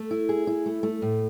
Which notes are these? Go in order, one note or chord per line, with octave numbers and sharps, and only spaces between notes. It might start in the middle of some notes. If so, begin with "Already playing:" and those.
Already playing: A3
E4
G#4
E4
A3
A3
A2